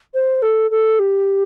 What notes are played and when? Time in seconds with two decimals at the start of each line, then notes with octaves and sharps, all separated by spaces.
0.14 C5
0.42 A4
0.70 A4
0.99 G4